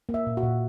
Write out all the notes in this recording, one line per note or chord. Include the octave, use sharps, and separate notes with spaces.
A#3
E5
A#2
F#4
A#2